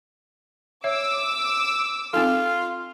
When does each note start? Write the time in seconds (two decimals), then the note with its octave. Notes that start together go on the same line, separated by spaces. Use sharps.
0.84 C#5 E5 D6 E6
2.13 C4 D#4 F4 A4